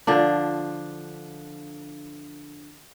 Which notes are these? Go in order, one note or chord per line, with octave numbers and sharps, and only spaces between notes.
D3 F3 D4